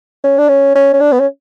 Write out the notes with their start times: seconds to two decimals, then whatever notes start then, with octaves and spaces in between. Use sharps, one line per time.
0.24 C#4
0.38 D4
0.48 C#4
0.75 C#4
0.93 C#4
1.00 D4
1.12 B3
1.19 C#4